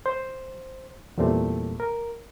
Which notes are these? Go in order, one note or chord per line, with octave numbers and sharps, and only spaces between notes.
C5
E2 A#2 G3 A3 C4
A#4